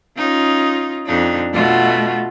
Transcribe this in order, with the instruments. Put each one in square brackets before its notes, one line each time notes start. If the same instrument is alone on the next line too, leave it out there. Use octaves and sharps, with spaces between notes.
[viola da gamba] C#4 D#4 F4
F2 D4 D#4
[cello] B2 A3 [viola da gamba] F4 F#4